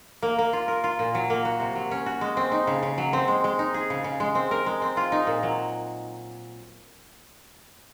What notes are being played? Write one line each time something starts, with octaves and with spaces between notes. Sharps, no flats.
A#3
A#3
F4
A#4
F4
A#2
F#3
A#3
F#4
C3
F#3
C#4
F#4
G#3
C4
D#4
C#3
C#3
F#3
C4
G#3
G#3
D#4
G#4
C#3
C#3
G#3
C4
A#4
G#3
C4
F4
D#4
A#2
F#3